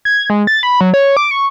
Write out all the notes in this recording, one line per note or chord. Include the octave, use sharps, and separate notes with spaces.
G#6
G#3
A6
B5
F#3
C#5
D6
C#6